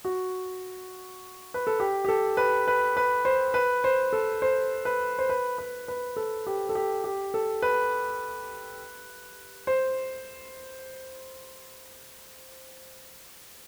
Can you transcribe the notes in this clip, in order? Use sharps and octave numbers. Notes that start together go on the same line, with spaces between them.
F#4
B4
A4
G4
G4
A4
B4
B4
B4
C5
B4
C5
A4
C5
B4
C5
B4
B4
B4
A4
G4
A4
G4
G4
A4
B4
C5